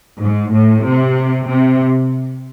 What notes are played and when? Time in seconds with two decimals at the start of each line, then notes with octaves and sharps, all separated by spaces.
0.21 G#2
0.53 A2
0.86 C3
1.48 C3